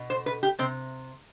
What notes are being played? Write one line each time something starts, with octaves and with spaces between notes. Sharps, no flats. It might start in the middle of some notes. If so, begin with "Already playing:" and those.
Already playing: B2
C5
B4
G4
C3 C4